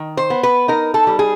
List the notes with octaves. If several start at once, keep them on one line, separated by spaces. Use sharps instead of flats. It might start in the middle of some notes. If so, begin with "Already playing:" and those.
Already playing: D#3
C5
B3
B4
D#4 A#4
A4
G3
G#4